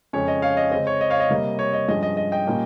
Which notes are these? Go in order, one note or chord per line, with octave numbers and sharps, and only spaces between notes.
F2 C#3 G#3 C#4 C#5
D#5
C#5 F5
D#5
C#3 G#3 C4 D#5
C#5
D#5
C#5 F5
D#5
C3 G3 A#3
C#5
D#5
G2 F3 G#3 C#4 D#5
D#5
D#5
D#5 G5
A#2 G3 A#3 C#4